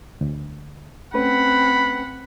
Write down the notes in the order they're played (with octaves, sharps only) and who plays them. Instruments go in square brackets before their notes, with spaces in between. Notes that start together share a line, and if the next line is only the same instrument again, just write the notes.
[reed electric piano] D2
[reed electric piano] A3 C#4 B4 [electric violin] C4 F#5 [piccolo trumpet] B5